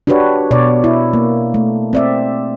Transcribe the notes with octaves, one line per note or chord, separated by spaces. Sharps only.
D4 F#4 G4 B4 C#5
B2 C#5 D5
E4
A#3
A3
C4 D5 E5